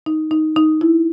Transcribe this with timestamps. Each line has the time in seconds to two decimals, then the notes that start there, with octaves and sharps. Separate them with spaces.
0.06 D#4
0.31 D#4
0.56 D#4
0.81 E4